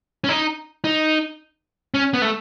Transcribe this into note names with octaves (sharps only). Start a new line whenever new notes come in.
C#4
D#4
D#4
C#4
B3
A3